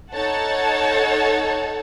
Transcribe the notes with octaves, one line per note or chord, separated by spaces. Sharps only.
D#4 A4 C#5 F#5 A5